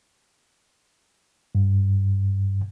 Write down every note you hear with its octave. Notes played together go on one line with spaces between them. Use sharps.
G2